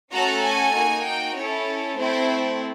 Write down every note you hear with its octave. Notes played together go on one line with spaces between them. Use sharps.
A3 C#4 F#4 A4 A#5
G#5
A#3 D#4 F#4
G5
C#4 E4 A4 C#5
A3 C4 E4 C5